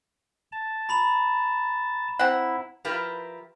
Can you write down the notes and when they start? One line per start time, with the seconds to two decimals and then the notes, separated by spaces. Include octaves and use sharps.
0.52 A5
0.89 A#5 B5 F7
2.19 C4 E4 F#5
2.85 F3 E4 F4 G4 A#4 B4